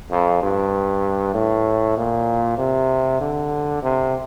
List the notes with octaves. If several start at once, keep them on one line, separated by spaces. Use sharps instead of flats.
F2
G2
A2
A#2
C3
D3
C3